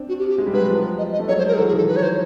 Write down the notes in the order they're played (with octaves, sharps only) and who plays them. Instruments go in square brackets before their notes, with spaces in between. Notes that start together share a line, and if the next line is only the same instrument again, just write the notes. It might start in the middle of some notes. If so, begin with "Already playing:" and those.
Already playing: [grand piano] C4 D4
[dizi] F#4
G4
G4
[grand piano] G#3
G3
[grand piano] F#3 G#3 [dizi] B4
[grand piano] F3 G3
[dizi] D#5
D#5
[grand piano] A3
[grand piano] F#3 G#3 [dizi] C#5
[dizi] C5
A#4
G#4
[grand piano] E3 F#3 [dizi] A4
[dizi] G#4
[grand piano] D#3 F3
[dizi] A4
B4
C#5
C5